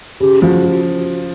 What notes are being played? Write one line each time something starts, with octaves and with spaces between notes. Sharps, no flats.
C#3 G4
F3 F#4